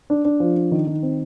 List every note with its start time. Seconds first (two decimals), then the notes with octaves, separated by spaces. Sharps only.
0.10 D4
0.25 D4
0.40 F3
0.56 D4
0.71 D#3
0.87 D#3
1.03 C4